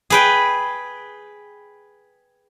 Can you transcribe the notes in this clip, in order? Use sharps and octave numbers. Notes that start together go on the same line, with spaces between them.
G#4 B4 G5